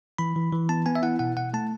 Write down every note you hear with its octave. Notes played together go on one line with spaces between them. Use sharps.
E3 B5
E3
E3
B3 A5
B3 G#5
E5
E4 F#5
B2 F#5
B2 F#5
A3 A5